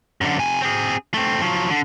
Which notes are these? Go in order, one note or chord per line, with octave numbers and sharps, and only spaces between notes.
F#2 D3
C3 G#5
C4 G#4
A3 C4
F3 F#3
D3